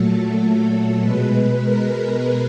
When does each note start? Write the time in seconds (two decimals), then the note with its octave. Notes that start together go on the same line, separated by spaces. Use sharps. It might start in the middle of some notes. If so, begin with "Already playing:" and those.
Already playing: A#2 F#3 A3 A4
1.00 B2 G#3 B4
1.63 A#4